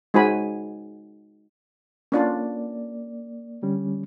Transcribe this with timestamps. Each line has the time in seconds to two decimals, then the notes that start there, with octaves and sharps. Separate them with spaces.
0.14 G#3 D#4 F#4 C5 G#5 B5
2.12 A#3 C#4 D4 F4 D5
3.62 D3 G3 C#4